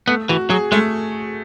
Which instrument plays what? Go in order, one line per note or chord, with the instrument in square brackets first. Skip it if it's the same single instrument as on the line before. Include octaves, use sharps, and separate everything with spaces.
[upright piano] A3 [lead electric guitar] B3
[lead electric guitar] E3 [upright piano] F#4
[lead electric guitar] F#3 [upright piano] G#4
[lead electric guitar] G#3 [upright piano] A3